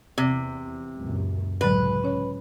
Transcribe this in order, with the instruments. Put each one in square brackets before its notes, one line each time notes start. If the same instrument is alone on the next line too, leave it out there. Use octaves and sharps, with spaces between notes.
[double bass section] E2 [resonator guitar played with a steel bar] C3
[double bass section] C#2 F#2 A#2
[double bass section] C#2 G#3 [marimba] A2 D3 F#3 [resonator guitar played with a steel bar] B4
[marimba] C#4 C#5